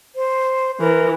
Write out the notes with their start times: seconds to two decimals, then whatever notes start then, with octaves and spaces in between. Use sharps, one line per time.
0.16 C5
0.80 E3 A#4